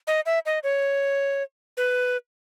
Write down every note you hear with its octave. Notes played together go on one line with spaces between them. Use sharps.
D#5
E5
D#5
C#5
B4